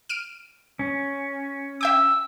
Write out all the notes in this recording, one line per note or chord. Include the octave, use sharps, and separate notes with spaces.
F6 D7 D#7
C#4
E5 G5 D6 E6